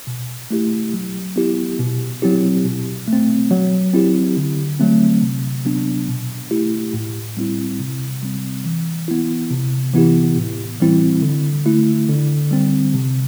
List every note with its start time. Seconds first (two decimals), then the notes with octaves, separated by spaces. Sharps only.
0.07 B2
0.51 A3 E4 G4
0.93 F#3
1.36 B3 E4 G4
1.79 B2
2.22 F#3 C4 E4 G4
2.65 B2
3.08 A3 C4
3.51 F#3
3.94 C4 E4 G4
4.37 D3
4.80 F#3 A3 C4
5.22 C3
5.65 F#3 B3 D4
6.08 B2
6.51 A3 E4 G4
6.94 A2
7.37 G3 C4 E4
7.79 C3
8.23 G3 C4
8.65 E3
9.08 B3 E4
9.50 C3
9.93 E3 B3 E4 G4
10.37 A2
10.80 E3 G3 C4 E4
11.22 D3
11.66 A3 E4
12.09 D3
12.51 G3 C4
12.94 C3